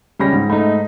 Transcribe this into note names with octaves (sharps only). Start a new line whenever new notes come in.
C#2 G3 C#4 B5 A#6
G#2
A3 D#4 D#5 B5